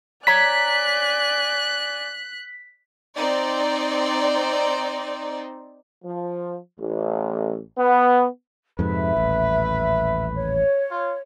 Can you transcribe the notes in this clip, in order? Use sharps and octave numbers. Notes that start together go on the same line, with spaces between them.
C#5 D5 G#5 A#5 F#6 B6
C4 D#4 D5
F3
A1
B3
F2 G#2 C3 B4 E5
D#1 A1
C#5
F4